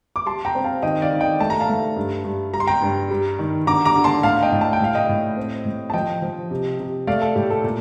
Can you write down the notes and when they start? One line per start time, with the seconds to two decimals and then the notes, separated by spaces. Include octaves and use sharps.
0.16 D6
0.26 G3 A5 C6
0.45 G5 A#5
0.55 C4
0.64 F5 A5
0.83 D#3 D#5 G5
1.02 D5 F5
1.11 D#3
1.21 D#5 G5
1.40 A3 A5
1.50 A#5
1.60 F5 A5
1.69 A3
1.96 G2
2.24 G2
2.53 G3 A#5
2.60 C6
2.67 G5 A#5
2.82 G2
3.10 G3
3.39 D#3
3.66 D3 A#5 D6
3.85 A#5 D6
3.96 D3
4.04 A5 C6
4.23 A2 F5 A5
4.43 D#5 G5
4.52 A2
4.61 A5
4.73 G5
4.80 A2 F5
4.95 D#5 G5
5.09 A2
5.37 C4
5.65 A2
5.90 A5
5.94 F3 D#5 G5
6.22 F3
6.51 C3
6.80 C3
7.07 A3 D5 F5
7.22 A4
7.35 A2 G4
7.50 A4
7.64 A#2